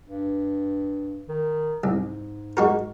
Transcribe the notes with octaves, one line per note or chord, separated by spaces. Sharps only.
G2
D#3
C2 G#2
G#3 F#4 A#4